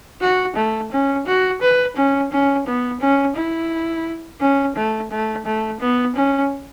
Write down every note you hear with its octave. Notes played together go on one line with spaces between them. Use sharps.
F#4
A3
C#4
F#4
B4
C#4
C#4
B3
C#4
E4
C#4
A3
A3
A3
B3
C#4